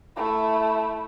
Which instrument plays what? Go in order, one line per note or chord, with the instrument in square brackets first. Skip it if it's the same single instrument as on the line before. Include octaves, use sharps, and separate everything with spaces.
[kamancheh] A3 E4